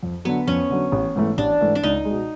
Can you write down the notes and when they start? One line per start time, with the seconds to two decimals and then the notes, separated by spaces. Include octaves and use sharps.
0.03 F2
0.25 D3 F#3 B3
0.47 F2 C#4
0.70 D3 F#3
0.92 A1
1.15 G#2 E3 A3
1.38 A1 D4
1.61 G#2 E3 A3
1.75 D4
1.83 C#2 D#4
2.05 B2 G#3